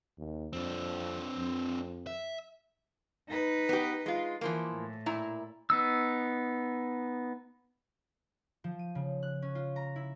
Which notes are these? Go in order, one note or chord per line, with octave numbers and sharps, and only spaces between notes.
D#2
F2 C4 D4
F2
E5
D#4 B4
B3 G4
G#3 F4
E3 F3 A#3
A2
A#2 E4 A#5
B3 D#4 E6
F3
D#7
C#3
F#6
C#4
F4
A#5
E4